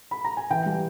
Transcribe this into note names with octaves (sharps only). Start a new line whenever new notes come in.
B5
A#5
G#5
E3 G5
G3